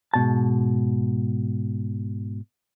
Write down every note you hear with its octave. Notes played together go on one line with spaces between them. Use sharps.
G#2 B2 A5